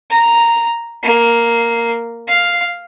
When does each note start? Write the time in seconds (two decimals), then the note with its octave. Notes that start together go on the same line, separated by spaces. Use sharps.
0.10 A#5
1.02 A#3
2.27 F5